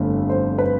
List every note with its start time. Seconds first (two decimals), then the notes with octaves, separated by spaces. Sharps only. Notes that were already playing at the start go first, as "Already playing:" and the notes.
Already playing: G1 F2 D3 A3
0.30 C5
0.58 B4